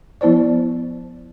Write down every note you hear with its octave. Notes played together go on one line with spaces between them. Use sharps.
F3 B3 E4 C5 D5